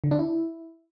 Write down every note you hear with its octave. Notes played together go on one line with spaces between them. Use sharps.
D3
D4
E4